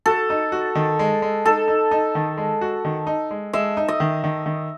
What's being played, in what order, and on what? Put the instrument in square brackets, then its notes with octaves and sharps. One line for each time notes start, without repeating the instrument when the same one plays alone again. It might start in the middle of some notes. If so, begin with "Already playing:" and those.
[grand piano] F#4 [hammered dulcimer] A4
[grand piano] D#4
F#4
D#3
G#3
G#3
[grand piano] D#4 [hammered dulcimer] A4
[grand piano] D#4
D#4
D#3
G#3
F#4
D#3
D#4
G#3
[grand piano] G#3 [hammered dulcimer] E5
[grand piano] D#4
[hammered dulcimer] D#5
[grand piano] D#3
D#3
D#3